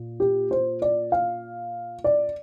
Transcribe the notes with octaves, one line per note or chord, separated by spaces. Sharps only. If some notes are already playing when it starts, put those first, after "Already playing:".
Already playing: A#2
G4
C5
D5
F5
D5